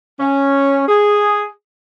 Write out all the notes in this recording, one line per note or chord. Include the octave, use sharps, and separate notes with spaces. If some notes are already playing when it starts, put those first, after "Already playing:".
C#4
G#4